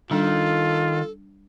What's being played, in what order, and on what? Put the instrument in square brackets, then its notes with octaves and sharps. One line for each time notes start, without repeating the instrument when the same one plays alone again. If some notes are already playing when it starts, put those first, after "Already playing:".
[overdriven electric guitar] D#3 [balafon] G3 D4 [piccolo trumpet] F4 [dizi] A4